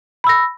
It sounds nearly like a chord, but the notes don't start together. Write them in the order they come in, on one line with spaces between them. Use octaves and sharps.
B5 E6 A#6